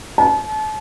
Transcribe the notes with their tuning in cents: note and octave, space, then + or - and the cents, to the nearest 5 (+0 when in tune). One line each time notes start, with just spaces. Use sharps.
A5 -35